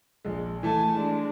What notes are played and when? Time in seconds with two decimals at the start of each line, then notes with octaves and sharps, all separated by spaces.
0.25 A#1 G#3
0.63 E3 A3 G#5 A5
0.93 G#3 D4